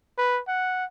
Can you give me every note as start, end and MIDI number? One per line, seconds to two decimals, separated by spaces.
0.18 0.40 71
0.48 0.85 78